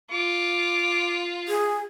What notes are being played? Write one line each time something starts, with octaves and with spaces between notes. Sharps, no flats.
F4 D6
G#4